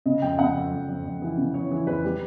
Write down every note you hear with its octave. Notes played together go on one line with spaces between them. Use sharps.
C#3 D#5
F2 G5
C#3 F#5
F2
F2
F2
F2
E3
C#3
E3 C#5
E3
F2 B4
G3